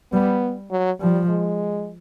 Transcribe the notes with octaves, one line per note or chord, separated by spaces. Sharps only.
G3 B3
F#3
F3 G3
G#3